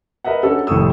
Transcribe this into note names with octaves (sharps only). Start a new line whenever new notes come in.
A#4 B4 D#5 E5 F#5
C#4 D4 F#4 A4
F1 A2 C4 C#6 D#6 E6